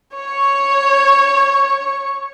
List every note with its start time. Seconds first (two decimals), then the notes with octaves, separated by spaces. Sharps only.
0.15 C#5 C#6